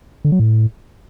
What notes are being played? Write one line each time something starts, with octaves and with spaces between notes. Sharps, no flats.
D3
F#3
A2